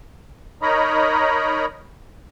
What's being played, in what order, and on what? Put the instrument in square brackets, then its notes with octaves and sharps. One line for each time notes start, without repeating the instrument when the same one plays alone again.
[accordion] D#4 A#4 C#5 D#5 A#5 B5